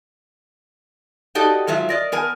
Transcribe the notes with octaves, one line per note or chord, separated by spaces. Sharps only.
D#4 F#4 G4 A4 D5 D#5
G#2 F#3 G#3 F4 E5
A#4 D5 D#5
B3 A#4 G#5